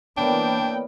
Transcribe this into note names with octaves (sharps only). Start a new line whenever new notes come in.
E3 A#3 B3 D4 C#5 D5 G5 B5